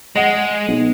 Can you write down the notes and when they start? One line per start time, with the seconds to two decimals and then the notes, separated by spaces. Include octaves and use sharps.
0.16 G#3 D#5 F#5 A#6
0.68 B1